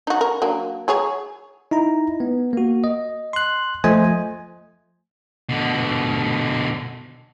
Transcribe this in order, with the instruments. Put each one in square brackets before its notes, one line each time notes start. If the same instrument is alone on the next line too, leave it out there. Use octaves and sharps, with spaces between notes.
[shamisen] D#4 F#4
A#4
F#3 A#3 D4
F#3 G#4 C#5
[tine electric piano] D#4 E4 A#5
B3
A#3 F#4
D#5
C6 F#6
F3 A3 C5 D#5 G#5
[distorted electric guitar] B2 D3